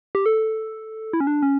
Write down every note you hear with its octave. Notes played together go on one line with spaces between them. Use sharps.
G4
A4
E4
C#4
D4
C#4